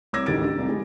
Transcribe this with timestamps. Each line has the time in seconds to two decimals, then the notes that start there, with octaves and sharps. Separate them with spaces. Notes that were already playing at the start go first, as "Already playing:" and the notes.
0.13 C2 C#5 D6 E6 G#6 A#6
0.26 A1 D2 D#3 G4 A6 D7
0.44 D3
0.57 F1 C2
0.68 G3 G#3